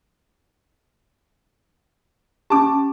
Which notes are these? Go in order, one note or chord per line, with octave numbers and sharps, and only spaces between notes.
C#4 G4 A5 D6